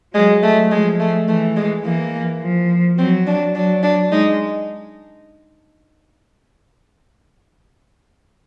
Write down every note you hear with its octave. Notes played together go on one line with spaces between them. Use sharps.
F#3 G#3
A3
F3 G#3
A3
E3 A3
G#3
E3 A#3
F3
F#3 C4
D4
F#3 D4
D4
G#3 D#4